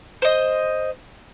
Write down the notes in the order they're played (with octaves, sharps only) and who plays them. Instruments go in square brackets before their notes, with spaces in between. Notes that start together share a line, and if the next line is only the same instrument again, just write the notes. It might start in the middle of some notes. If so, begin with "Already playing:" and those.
[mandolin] C5 D#5